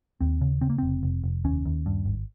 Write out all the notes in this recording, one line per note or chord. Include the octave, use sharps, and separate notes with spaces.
D#2 C4
C#3
C#3 C4
A#3
F1 C4
F1
F1
D#2 C#4
D#2
G2
G#1